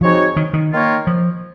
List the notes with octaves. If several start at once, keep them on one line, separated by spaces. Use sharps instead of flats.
F3 G#3 C4 D#4 F#4 C#5
D#3
D#3
D#3 A#3 F4 A#4 C#5
F3